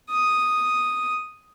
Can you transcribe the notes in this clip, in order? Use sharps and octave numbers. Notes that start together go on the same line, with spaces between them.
D#6